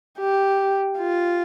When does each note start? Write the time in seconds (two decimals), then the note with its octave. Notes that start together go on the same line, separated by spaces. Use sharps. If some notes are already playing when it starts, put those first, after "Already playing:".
0.19 G4
0.99 F4